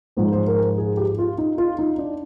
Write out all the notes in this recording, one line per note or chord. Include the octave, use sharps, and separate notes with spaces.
G#2 F3 G#3 C5
C5
A#4
G#4
G4
F4
D#4
F4
D#4
D4